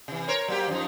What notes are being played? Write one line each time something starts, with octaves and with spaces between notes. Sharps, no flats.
C3 E3
A#4 C5 C#5
F#3 A#3 G4
F#2 F3 D#4